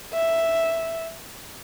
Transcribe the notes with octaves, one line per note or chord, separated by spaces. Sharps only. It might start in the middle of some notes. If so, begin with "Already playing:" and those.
E5